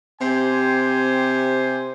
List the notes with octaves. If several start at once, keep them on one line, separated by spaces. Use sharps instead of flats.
C3 G4 C5 G#5